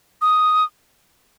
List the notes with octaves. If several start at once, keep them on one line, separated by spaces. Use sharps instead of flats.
D#6